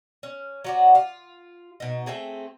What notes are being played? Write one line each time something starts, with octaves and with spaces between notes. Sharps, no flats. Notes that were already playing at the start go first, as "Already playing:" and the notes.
C#4
F#3 F#4 D5
F4
B2 D#4
A3 C4 G#4 G5